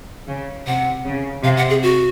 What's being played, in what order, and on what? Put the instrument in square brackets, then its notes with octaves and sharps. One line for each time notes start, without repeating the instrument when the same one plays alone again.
[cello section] C#3
[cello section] C3 [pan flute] F#5
[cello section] C#3
[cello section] C3 [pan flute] F5
[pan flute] F#5
G#4
F#4